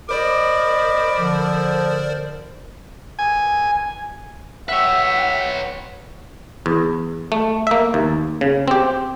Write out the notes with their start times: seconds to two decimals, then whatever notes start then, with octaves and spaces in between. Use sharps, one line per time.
0.09 A#4 C5 D5 D#5 B5 D6
1.18 D3 F3
3.19 G#5
4.68 B4 C#5 E5 F#5 G5
6.66 E2
7.32 A3
7.67 A#3 E5
7.94 D#2
8.41 C#3
8.68 C4 G4